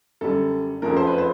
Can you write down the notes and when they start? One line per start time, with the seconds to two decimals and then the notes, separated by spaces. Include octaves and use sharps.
0.21 F#2 D3 G3 A4
0.82 F#1 F2 C#3 F3 A3 A#4
0.97 C5
1.07 B4
1.18 C5